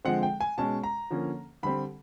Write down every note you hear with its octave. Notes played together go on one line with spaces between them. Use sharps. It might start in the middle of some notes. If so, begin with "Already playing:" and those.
D3 F3 G#3 C4 F#5
G5
G#5
B2 G#3 C#4 A5
A#5
D3 F3 A#3 C#4
D3 G3 C4 B5